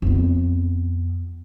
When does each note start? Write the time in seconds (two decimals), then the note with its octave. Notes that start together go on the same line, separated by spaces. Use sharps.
0.02 F2 B3